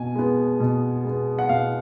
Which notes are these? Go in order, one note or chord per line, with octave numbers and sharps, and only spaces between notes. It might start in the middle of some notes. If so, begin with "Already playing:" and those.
Already playing: B2 B3 G#5
G#3 B3
B2
G#3 B3
F#5
B2 F5